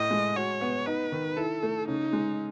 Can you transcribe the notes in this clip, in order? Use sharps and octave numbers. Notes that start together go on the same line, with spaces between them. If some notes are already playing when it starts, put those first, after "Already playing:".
Already playing: A2 D#5
G#3
F#4 C#5
B3
D#4 B4
D#3
E4 A4
A3
C#3 D#4
G#3